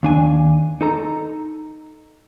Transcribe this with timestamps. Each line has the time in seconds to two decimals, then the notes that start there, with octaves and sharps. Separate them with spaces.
0.03 D#2 D4 G#5
0.81 D#4 A4 A#5